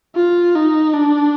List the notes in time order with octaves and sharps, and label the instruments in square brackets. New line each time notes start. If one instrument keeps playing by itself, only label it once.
[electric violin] F4
D#4
D4